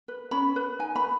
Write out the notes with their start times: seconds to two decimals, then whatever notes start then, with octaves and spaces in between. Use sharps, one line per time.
0.08 B4
0.31 C#4 B5
0.56 B4
0.79 D#4 G#5
0.96 B5
1.04 B4